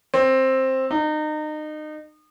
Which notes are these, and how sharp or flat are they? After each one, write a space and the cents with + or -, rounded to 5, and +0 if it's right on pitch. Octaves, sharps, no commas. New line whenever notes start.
C4 +10
D#4 -30